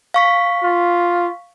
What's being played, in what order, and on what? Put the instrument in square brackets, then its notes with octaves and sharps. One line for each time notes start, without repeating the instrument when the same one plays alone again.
[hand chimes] F5 C#6 B6
[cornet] F4